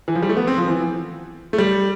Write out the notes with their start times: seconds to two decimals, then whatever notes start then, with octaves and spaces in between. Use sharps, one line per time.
0.08 E3
0.15 F3
0.23 G3
0.29 A3
0.37 B3
0.47 C4
0.58 F3
0.68 E3
1.53 A3
1.58 G3